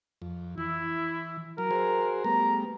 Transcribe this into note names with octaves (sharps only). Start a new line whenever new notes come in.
F2
E3 E4
F#3 A#4
F#4 G#4 C5
G3 A3 B3 A#5